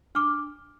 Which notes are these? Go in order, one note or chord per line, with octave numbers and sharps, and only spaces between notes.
D4 D6 F6